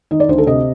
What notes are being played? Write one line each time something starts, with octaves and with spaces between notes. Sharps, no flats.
D#3 D#5
D5
D2 C5
A4
C3 D#5